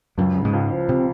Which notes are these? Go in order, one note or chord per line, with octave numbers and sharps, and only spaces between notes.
C#2 F#2 F#3
C#3
G#2 G#3
C#2
F3
C3 C4